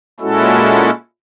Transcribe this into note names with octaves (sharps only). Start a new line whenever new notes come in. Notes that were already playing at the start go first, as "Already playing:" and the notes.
A#2 G#3 C#4 E4 F#4 A4